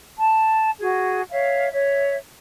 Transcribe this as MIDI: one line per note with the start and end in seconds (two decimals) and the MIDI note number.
0.18 0.70 81
0.80 1.22 66
0.80 1.22 68
1.31 1.67 73
1.31 1.67 76
1.31 1.67 77
1.72 2.15 73
1.72 2.15 76